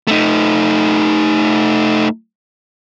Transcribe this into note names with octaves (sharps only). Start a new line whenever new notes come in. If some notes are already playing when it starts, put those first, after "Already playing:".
A3 D#4